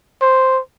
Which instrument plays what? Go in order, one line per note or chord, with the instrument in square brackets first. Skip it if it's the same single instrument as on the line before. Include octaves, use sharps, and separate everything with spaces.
[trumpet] C5